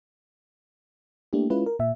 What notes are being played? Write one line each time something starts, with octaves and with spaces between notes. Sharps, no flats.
A3 A#3 D4 E4 G4
G#3 C#4 E4 F4 B4
A#4
A#2 E5